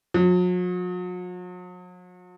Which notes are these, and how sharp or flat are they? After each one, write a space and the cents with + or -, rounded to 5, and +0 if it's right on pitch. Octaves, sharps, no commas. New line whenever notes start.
F#3 -45